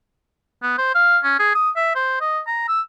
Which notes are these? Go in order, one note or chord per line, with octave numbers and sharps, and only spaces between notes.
B3
C5
F5
C#4
G#4
D#6
E5
C5
D#5
A#5
E6